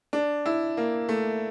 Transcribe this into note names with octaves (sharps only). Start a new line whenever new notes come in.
D4
E4
A#3
A3